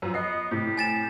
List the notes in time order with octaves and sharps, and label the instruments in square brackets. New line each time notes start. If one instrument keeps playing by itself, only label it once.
[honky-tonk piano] F#2 F3
[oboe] B3 [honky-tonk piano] D#5 C7
[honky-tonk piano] A2 C3 [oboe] G4
[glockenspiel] G#5 A6 E7